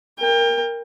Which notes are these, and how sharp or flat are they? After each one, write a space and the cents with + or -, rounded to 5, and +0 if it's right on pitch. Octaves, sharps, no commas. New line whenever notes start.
A#4 +0 G5 +30